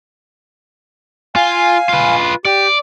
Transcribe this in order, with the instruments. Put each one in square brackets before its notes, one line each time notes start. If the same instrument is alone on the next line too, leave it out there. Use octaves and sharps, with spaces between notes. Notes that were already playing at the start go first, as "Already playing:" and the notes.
[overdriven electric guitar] F4 [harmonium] F5 G#5
[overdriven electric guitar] F4 B4
[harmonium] G4 [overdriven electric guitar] D5